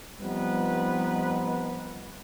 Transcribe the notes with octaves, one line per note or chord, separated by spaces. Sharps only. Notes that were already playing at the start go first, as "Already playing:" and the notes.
F3 G3 B3 C4 D#4 B4